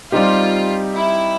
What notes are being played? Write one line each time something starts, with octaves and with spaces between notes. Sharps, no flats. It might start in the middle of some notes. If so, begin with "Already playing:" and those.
G3 C4 D#4 F4 G4
E4